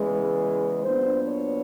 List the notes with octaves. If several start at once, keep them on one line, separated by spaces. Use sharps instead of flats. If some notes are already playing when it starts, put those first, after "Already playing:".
Already playing: E2 C#3 E3 G#3
A#2 F#3 B3 D4 C5
C#5